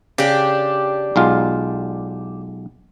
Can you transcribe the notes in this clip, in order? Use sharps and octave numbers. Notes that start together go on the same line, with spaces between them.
C#3 D4 G4
B1 G#3 F4